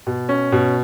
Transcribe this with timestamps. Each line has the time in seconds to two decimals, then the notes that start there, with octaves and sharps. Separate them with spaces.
0.07 B2
0.29 C#4
0.52 B2